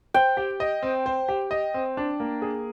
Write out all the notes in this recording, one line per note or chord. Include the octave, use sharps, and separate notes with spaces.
C5 G5
G4
D#5
C4
C5
G4
D#5
C4
D4
A#3
G#4